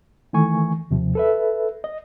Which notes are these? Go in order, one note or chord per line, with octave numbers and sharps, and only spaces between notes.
D#3 E3 A3 G#5 C#6
D#2 C3 F3
A4 B4 E5
D#5